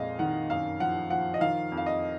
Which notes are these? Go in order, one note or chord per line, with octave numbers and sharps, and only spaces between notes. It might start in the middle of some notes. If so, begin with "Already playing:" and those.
Already playing: F2 A#2 G#3 D#5 F5
D#3 F#5
F#2 F5
F3 F#5
F3 F#5
D#5
D#3 F5
F2
F5
D#5